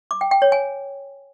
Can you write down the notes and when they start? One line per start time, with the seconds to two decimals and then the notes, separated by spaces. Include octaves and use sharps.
0.11 D6
0.21 G5
0.31 G5
0.42 C#5
0.52 G#5